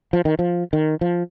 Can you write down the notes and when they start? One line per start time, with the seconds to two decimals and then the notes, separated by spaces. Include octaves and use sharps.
0.13 F3
0.25 D#3
0.39 F3
0.73 D#3
1.01 F3